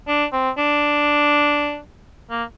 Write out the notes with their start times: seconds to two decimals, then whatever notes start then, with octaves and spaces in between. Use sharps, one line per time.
0.08 D4
0.33 C4
0.58 D4
2.30 A#3